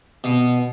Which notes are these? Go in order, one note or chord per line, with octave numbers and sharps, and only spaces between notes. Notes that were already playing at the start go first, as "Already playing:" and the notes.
B2